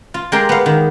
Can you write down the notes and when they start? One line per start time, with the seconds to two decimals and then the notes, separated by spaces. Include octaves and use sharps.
0.14 F4
0.32 G#3 G4 A#4 G5 C6
0.49 B3 F5
0.66 D#3